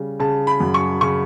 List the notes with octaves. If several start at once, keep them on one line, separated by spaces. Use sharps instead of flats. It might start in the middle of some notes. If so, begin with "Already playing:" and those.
Already playing: C#3 G3
C#3 A5
B5
F#2
C#6
C#3 C#6